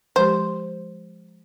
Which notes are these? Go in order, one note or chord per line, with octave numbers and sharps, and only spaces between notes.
F3 G#3 G4 C5